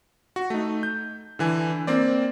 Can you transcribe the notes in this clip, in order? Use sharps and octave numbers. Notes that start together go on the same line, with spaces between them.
F#4
A3 D#4
G6
D3 E3 G#5
A#3 C4 D5